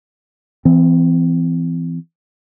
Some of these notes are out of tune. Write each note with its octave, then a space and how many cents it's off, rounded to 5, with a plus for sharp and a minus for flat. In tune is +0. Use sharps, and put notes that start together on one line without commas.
E3 +20 C4 -30